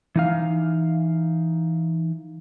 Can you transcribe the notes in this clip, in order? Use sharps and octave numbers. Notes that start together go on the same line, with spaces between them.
E3 D#4 F5